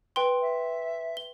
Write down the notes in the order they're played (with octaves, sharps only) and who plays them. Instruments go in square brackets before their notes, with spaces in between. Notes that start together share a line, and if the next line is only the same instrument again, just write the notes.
[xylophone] B4 G5 C6
[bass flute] E5
[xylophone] G7